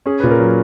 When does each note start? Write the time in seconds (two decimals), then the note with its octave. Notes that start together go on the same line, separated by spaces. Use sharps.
0.06 C#4 G#4
0.20 A#2 B4
0.31 A#4
0.39 F#3